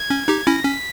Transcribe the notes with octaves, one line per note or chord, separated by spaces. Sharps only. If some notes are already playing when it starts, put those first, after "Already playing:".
Already playing: G#6
C#4
D#4 G4
C#4 E4 A#6
C#4 B6